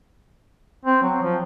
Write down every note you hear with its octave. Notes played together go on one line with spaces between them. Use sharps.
C4
F#3
F3